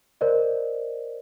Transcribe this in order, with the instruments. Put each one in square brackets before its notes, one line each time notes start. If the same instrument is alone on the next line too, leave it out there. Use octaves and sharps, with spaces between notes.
[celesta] A#4 C5 D5 D#5